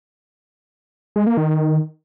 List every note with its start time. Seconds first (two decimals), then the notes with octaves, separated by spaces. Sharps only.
1.16 G#3
1.27 A#3
1.37 D#3